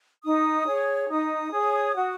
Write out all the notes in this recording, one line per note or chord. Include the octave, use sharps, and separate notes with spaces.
D#4 D#6
G#4 C#5
D#4 D#6
G#4 C#5
F#4